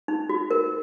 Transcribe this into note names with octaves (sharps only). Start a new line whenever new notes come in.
D#4
F#4
A#4